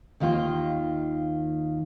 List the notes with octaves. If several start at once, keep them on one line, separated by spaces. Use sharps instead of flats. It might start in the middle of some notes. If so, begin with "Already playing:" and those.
D#2 D#3 A#3 F4 G5